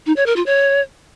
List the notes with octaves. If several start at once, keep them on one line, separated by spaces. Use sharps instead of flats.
D#4
C#5
A#4
F4
C#5